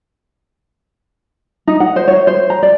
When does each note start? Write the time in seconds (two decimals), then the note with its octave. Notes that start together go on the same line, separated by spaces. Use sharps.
1.67 D#4
1.80 F#5
1.96 C5
2.08 C#5
2.27 C5
2.50 A#5
2.63 D5